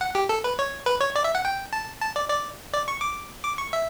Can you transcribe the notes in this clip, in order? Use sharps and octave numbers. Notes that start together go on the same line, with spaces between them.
F#5
G4
A4
B4
C#5
B4
C#5
D5
E5
F#5
G5
A5
A5
D5
D5
D5
C#6
D6
D6
C#6
E5